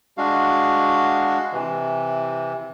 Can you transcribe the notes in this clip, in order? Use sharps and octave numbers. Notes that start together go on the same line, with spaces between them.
G#3 D4 F#4 F5
C3 E3